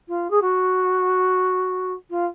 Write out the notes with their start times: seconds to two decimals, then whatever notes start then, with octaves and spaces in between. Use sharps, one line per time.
0.08 F4
0.30 G#4
0.42 F#4
2.10 F4